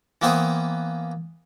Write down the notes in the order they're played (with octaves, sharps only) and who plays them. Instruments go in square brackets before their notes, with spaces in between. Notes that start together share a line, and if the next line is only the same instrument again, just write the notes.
[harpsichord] E3 A#3 B3 C5 G5 D#6